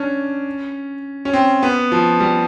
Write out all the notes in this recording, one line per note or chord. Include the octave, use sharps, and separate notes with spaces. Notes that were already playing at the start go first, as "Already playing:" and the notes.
Already playing: C#4 D4
C#4
C4
B3
F3
G3